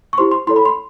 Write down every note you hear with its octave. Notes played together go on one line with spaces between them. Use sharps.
C#6
E4 G4 C5 C6
C6
E4 A4 C#5 C6
B5
C6